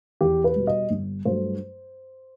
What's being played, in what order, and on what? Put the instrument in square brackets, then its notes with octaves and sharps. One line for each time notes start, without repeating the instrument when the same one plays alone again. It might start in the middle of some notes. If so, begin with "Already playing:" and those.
[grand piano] E2 G4
B4
B2 G3
D#5
G1
G2 F#3 A3 C5